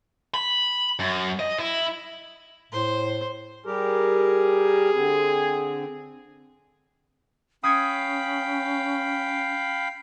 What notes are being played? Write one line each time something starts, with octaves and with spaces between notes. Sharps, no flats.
B5
F#2
D#5
E4
A2 C5 C6
G3 G4 G#4 A#4
D3 C4
C#4 F5 G5 B5 D#6 G#6 C#7